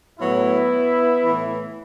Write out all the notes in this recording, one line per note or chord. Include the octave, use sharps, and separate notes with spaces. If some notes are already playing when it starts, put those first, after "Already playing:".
A2 F#3 B3 E4
A2 E3